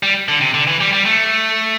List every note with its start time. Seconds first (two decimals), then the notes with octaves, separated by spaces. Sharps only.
0.03 G3
0.28 D3
0.41 C3
0.54 D3
0.67 E3
0.81 G3
0.93 G3
1.06 A3